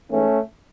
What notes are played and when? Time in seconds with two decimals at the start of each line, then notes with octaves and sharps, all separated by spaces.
0.09 G#2 E3 A3 C#4